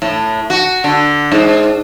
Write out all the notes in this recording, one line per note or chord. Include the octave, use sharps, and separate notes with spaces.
A2
F#4
D3
G#2